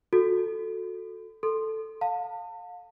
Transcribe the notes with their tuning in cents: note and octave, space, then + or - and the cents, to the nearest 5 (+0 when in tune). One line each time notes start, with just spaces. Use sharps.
F#4 -20 A4 +0
A4 +0 C6 +0
F5 +30 A5 +35